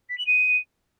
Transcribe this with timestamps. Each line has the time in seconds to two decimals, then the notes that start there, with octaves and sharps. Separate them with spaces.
0.09 B6
0.18 F#7
0.26 D#7